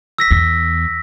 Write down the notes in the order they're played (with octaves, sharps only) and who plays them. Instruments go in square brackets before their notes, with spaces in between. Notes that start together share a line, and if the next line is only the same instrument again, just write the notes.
[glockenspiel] E6 A#6 B6
[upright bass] E2